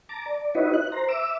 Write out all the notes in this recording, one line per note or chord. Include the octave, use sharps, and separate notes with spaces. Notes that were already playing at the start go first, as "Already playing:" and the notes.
A5 A#5 D6
D5
D#4 E4 F#4 B4 C#5 D#5
F#6
C5 A#5
E5 D6 E6